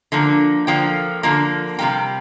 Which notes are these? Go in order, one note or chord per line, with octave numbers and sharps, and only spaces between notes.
D3 F3 A#3
D3 F3 A#3 G5
D3 F3 A#3
C3 G3 A#3 G5